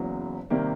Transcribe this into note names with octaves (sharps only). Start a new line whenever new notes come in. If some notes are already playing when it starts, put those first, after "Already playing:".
Already playing: F#1 E2 C#3 F#3
C3 D#3 G3 A#3